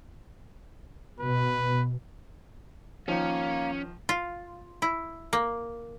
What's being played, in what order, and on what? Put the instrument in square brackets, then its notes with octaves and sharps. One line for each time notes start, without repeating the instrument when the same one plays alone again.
[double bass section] B2 [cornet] B4
[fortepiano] D#3 F3 [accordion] A#3 [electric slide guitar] C#4
[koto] F4
E4
A#3